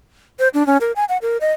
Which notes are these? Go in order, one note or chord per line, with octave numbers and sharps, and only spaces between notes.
C5
D4
C#4
A#4
G#5
F#5
A#4
D#5